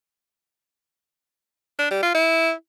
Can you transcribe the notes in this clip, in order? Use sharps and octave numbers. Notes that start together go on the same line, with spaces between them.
D4
G3
F4
E4